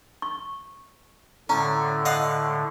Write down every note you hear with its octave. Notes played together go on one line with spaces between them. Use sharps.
C#6
A2 D3 C#4 A#5
D#5 F5 F#5